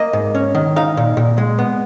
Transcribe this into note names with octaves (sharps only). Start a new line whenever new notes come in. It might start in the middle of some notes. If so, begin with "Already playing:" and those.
Already playing: A#3 D#5
G#2
C#4
D#3
D#4 F5
A#2
A#2
G#3
B3